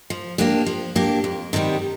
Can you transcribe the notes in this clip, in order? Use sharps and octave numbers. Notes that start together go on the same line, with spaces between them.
F3
A#3 D4 G4
F3
A#3 D4 G4
F2
C3 D#3 G3 B3